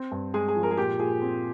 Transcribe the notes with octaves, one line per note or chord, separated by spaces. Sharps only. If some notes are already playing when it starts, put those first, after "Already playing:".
Already playing: C4
G2
G#3 G#4
G#4
F3
A#4
G#4
A#2 G4
A#2 G#4
C4